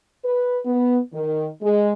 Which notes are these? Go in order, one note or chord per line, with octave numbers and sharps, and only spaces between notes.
B4
B3
D#3
G#3